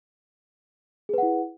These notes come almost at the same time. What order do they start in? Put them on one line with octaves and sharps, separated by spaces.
G#4 B4 F#5 E4